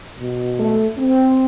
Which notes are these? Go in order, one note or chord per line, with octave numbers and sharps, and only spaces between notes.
B2
A3
C4